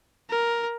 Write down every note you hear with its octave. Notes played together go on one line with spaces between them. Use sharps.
A#4